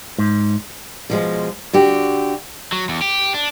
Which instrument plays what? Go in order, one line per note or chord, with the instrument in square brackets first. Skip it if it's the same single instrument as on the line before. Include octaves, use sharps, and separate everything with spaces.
[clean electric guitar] G#2
[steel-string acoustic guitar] B2 F3 G#3
D3 F#4 G4
[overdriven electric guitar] F#3
E2
G4
D4